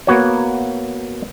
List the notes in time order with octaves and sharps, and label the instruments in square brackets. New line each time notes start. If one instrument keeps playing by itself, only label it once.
[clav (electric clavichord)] A#3 B3 F#4 C#5